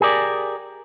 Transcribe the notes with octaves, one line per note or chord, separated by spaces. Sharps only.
G4 G#4 A#4 D5